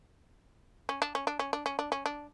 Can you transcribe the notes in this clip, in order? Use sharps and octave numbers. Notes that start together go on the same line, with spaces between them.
C#4
D4
C#4
D4
C#4
D4
C#4
D4
C#4
D4